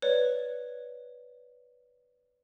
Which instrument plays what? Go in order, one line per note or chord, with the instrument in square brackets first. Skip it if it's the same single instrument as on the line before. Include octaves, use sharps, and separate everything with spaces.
[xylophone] B4 C#5 D5